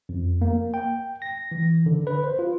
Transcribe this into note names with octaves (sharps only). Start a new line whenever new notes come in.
F2
A#3
G5
A#6
E3
D3
B4
C5
F4